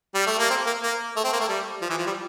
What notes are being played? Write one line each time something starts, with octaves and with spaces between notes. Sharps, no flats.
G3
A3
A#3
C4
A#3
A#3
A3
C4
A#3
A3
G3
F3
E3
F3
G3